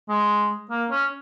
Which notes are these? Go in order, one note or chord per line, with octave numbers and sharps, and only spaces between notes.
G#3
A#3
C#4